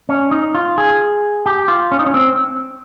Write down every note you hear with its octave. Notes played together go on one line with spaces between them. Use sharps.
C#4
D#4
F4
G#4
G4
F4
C#4
D#4
C#4
C4